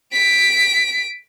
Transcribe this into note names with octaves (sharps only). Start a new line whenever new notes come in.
B6 D7